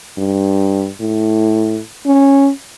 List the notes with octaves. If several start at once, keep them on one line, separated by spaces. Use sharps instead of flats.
G2
A2
C#4